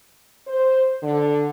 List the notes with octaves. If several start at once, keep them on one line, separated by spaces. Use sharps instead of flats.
C5
D3